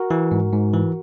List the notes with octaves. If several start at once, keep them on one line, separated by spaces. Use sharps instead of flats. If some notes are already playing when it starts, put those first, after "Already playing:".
Already playing: F#4 A#4
E3
G#2
G#2
E3